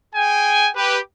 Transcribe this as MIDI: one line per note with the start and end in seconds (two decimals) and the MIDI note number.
0.15 0.69 68
0.15 0.69 79
0.15 0.69 80
0.76 0.99 67
0.76 0.99 71